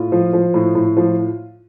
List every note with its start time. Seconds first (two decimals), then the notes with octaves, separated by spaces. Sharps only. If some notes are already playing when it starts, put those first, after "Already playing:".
Already playing: A2 F4
0.12 F3
0.33 F3
0.54 A2
0.75 A2
0.97 F3